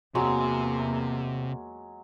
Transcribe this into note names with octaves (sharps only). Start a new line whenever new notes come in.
E2 C3 F#3 G#3 A#3